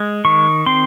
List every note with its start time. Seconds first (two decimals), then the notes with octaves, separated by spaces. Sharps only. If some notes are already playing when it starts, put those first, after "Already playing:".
Already playing: G#3
0.25 D#3 C#6
0.66 C4 C6